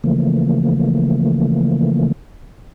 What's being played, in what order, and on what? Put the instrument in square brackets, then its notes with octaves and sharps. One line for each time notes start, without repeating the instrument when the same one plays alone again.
[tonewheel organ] C#3 E3 F3 A3 A#3